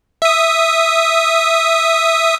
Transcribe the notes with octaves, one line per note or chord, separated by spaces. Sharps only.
E5 D#6